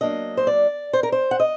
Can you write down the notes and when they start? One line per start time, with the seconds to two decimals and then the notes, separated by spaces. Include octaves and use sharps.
0.01 F#3 A#3 D4 D#5
0.37 C5
0.47 D5
0.93 C5
1.03 A#4
1.12 C5
1.31 F#5
1.40 D#5